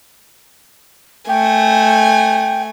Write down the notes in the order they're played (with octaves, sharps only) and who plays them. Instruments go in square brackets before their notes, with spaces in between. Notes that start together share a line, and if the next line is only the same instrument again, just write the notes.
[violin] A3 G#5 [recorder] G5